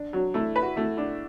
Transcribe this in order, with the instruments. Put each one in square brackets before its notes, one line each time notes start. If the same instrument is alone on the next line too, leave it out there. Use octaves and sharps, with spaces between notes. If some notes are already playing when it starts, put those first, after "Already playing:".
Already playing: [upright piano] D4
[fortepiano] F#3
[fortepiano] A3 [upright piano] E4
[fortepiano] B4
[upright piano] F#4
[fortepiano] A3 [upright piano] E4
[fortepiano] D4 [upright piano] E4